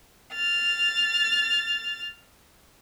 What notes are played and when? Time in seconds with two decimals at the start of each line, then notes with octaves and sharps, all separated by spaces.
0.34 F6 A6